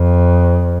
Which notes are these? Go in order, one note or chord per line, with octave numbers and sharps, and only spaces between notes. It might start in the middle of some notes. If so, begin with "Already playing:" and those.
Already playing: F2